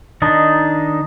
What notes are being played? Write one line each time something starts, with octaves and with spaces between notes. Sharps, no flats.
D#3 D4 D#4